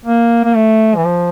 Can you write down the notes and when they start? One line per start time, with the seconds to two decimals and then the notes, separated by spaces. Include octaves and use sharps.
0.05 A#3
0.44 A#3
0.55 A3
0.96 E3
1.05 F3